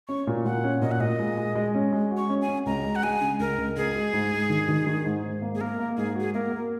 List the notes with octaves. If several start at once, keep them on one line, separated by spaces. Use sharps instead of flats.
C#4 C#6
A#2
A#2 F#5
C#4
A#2 D#5
F#5
A#2 D#5
G#3
G#3
G#3
C#4
G#3
F#4
C#6
C#4
G#5
C#4
C#2 A#5
G#3
F#5
G#3 G#5
C#3
C#2 A#4
C#2
C#2 G#4
G#3
G#2
G#2
D#3
D#3
D#3
G#2
G#2
A#3
G#4
A#3 A#4
A#3
G#2 G#4
F#4 G#4
A#3 A#4
A#3